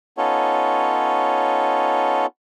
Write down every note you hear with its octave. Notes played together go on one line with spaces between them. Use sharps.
B3 C#4 D#4 F4 A4 C#5